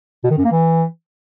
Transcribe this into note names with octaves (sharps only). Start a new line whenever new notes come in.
B2
D#3
F#2
A#3
E3